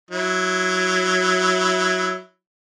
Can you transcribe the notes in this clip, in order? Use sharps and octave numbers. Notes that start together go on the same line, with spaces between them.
F#3 E4